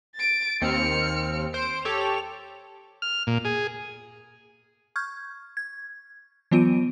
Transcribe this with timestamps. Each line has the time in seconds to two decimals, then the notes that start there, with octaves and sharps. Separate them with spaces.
0.15 A6 D7
0.62 D#2 C4 F6 C#7
1.54 C5 D7
1.85 G4 A4 C#5 F7
3.02 F6
3.27 A#2
3.45 G#4
4.96 C#6 F6 G6 G#6
5.57 G#6
6.51 E3 F#3 B3 F4 D7 D#7